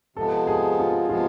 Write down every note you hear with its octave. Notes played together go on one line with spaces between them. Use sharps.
C3 F3 G#3 B3 A4
G#4
F4
C3 F3 G#3 B3 F4